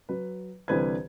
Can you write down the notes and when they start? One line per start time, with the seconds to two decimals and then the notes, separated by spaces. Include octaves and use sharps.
0.09 F#3 B4
0.68 C2 D3 E3 B4 C5 G#6